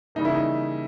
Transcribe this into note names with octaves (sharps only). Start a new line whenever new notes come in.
C#3 E3 G3 A#3 D#4
E4
D#4